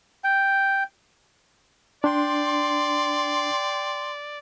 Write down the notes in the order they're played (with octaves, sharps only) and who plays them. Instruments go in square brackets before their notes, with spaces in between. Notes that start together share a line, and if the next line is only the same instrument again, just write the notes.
[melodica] G5
[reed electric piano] D4 [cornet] D5 [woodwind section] G5 C6